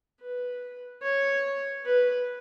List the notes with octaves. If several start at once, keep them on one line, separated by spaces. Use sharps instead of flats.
B4
C#5
B4